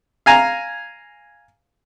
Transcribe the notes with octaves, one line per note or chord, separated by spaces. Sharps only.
F5 G#5 A#5